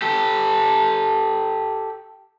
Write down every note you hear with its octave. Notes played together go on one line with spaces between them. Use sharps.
G4 A4